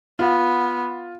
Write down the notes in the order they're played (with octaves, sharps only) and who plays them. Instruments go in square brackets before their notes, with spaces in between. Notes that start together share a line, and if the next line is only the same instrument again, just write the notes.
[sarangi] B3 [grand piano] F4